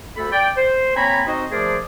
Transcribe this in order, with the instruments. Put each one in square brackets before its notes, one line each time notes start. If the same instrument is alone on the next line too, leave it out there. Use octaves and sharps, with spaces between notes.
[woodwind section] D2 A4 B5
D5 G5
C5
A#3 C4 C#5 G#5 A#5 B5
C4 D#4 F#4 C5 D#5
F3 A3 G#4 A#4 C5 D5